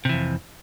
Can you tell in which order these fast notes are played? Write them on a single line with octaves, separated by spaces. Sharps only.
C3 E3 F2